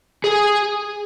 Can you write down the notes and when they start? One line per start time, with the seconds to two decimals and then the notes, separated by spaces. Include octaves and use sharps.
0.24 G#4